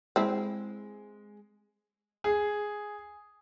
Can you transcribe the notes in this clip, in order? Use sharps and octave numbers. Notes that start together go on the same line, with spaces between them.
G#3 C4 E4
G#4